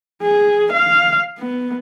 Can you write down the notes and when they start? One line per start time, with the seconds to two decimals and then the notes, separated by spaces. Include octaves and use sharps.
0.22 G#4
0.73 F5
1.39 B3